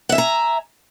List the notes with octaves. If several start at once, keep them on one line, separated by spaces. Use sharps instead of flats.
E5 F#5 G#5 A#5